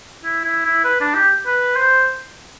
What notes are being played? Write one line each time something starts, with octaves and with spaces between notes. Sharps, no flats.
E4
E4
E4
B4
D4
G4
B4
C5